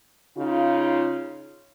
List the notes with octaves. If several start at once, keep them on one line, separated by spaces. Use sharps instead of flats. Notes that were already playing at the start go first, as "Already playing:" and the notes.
C#3 D#4 F4